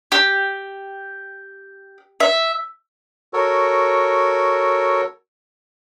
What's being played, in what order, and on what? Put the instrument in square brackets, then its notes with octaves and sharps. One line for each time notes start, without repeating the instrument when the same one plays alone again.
[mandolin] G4
E5
[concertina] F#4 A4 A#4 C#5